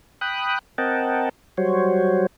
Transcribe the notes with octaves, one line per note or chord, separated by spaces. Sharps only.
G5 B5 D#6 F#6
C4 A#4 D#5 F#5 G5 A5
F#3 G3 F#4 C5 C#5